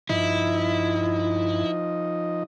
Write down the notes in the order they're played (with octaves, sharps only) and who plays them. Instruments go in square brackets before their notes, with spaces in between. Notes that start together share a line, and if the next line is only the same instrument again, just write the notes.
[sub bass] G2 [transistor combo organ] F3 D#4 D#5 [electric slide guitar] E4